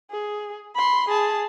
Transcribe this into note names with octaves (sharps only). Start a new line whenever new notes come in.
G#4
B5 C6
G#4 A5